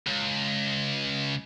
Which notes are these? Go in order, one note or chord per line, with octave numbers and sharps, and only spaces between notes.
C#2